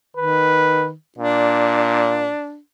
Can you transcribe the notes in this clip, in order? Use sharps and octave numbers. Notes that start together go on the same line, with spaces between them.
D#3 B4
A#2 D4